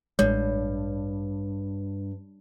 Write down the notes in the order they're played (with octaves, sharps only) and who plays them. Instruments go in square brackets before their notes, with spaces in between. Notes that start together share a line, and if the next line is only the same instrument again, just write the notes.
[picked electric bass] A1 G#3 [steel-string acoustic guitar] G2 [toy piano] C#5